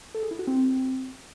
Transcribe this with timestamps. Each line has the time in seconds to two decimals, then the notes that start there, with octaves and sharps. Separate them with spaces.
0.14 A4
0.23 G#4
0.31 E4
0.39 F#4
0.47 C4